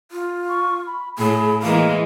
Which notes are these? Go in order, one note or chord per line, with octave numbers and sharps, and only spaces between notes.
F4
C#6
B5
A2 G#4 B5
E3 G#3 A#3 F5